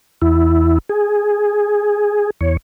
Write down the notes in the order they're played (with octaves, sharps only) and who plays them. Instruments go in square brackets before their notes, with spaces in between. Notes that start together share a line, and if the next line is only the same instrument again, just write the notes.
[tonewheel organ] E2 E4
G#4
E2 C#5